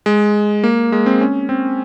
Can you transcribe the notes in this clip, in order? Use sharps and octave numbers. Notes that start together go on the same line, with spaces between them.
G#3
A#3
G#3
C4
C#4
C4